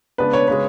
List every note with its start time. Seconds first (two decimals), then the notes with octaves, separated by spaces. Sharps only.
0.18 C#3 G#3 B3 D4 B4
0.33 C#5
0.48 C#3 G#3 B4